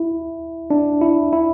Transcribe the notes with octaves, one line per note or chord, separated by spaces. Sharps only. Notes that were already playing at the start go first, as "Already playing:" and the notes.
Already playing: E4
D4
E4
E4